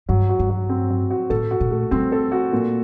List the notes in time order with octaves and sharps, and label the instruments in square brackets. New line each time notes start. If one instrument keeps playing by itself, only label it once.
[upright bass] G2 [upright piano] F#3
[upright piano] F#4
[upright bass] G2
[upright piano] F#3
C4
F#3
F#4
[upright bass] A2 [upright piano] A4
[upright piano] F#4
[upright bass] A#2
[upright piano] A3
[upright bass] G3 [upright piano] C4
[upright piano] A4
F#4
A#2